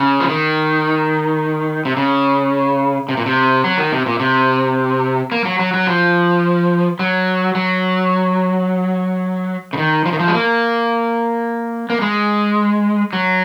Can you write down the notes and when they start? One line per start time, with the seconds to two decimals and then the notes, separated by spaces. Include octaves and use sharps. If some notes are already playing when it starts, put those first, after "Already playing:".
Already playing: C#3
0.20 F3
0.29 D#3
1.85 C3
1.97 C#3
3.09 C3
3.17 A#2
3.26 C3
3.64 F#3
3.78 D#3
3.92 C3
4.06 A#2
4.20 C3
5.32 A#3
5.45 F#3
5.59 F#3
5.74 F#3
5.87 F3
6.99 F#3
7.55 F#3
9.73 C#3
9.78 D#3
10.06 F3
10.13 D#3
10.20 F3
10.28 G#3
10.34 A#3
11.90 A#3
12.02 G#3
13.13 F#3